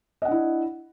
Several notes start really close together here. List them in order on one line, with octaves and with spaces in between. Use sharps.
D#5 F#5 D4 E4